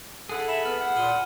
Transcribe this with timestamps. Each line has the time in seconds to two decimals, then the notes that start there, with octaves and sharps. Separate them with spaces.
0.29 E4 G#4 A4 F#5
0.48 E5 B5 E7 F#7
0.65 B3 F6
0.80 F#5
0.96 A#2 F6 D#7 G7